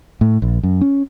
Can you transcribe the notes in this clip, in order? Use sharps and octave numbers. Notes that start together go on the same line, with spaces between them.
A2
A#1
F#2
C#4